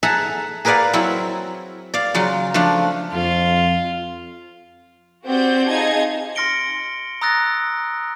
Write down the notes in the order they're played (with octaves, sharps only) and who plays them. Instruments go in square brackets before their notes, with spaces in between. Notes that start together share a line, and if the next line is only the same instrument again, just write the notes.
[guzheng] G#4 A4 E5 F#5 A#5
G#4 A#4 B4 D5 F5 F#5
F#3 C4 E4
D5 F5
C#3 F#3 F4
F3 A3 D4 F4
[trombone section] F2 [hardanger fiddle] F4
[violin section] C4 F#4 G4 D5 F#5 G6
D#4 F4 G#4 D#5 A5 G#6
[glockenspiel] C6 F6 A#6 C#7 D7 G7
A#5 D#6 E6 F#6 A6 A#6